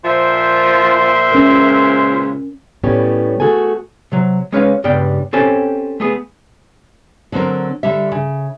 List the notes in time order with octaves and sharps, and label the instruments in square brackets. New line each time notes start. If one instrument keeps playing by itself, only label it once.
[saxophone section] A#2 E5 [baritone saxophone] F3 [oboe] C5
[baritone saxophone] C#2 [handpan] C#4 A#4
[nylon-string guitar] A2 G3 B3 C#4 G4 C#5
A3 F#4 G#4 A4 G#5
[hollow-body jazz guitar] C3 F#3
G#3 C#4 B4 C#5 F5
C#2 G2 G3 B3 D4 G5
C4 C#4 G4 A4 G#5
A3 B3 G#4
[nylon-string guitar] D3 F#3 C4 A#4
D3 G3 E5
C#3